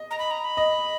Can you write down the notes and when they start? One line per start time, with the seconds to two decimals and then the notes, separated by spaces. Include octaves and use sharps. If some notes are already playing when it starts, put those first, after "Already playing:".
Already playing: D#5
0.11 A#5
0.19 B5
0.31 A#5
0.44 B5
0.57 D#5